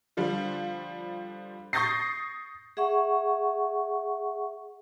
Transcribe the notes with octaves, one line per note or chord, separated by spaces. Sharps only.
D3 F3 G3
C#6 D#6 G6 A6 A#6 C7
G#4 E5 F#5 C#6